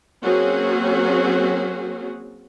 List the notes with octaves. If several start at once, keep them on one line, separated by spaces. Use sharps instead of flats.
F#3 A#3 C4 C#4 F#4 G#4